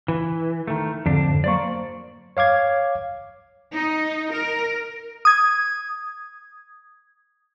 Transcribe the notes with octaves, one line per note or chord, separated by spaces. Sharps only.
E3
D#3 A3
F2 G#2 D3 D4
F#3 A#3 C5 D5 C#6
C#5 F5 D6 G#6
D#4
A#4
D#6 G#6